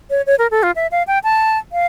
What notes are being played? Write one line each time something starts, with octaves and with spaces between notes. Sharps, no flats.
C#5
C#5
A#4
A4
F4
E5
F5
G5
A5
F5